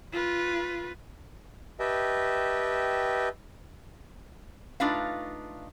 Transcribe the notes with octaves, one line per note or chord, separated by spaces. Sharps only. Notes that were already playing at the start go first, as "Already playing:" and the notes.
F4 B4
G4 B4 D#5 E5 G5 A5
A3 D4 D#4 F4 B4 F5